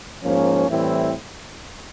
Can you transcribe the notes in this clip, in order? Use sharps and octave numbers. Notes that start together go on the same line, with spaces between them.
G#2 F3 A#3 C#4
A2 E3 G3 C4 E4